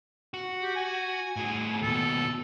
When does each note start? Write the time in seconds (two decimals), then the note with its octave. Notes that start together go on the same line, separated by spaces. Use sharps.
0.34 F#4
0.62 G4
0.76 G#5
1.36 A2 G#4
1.82 D#2 B2 A4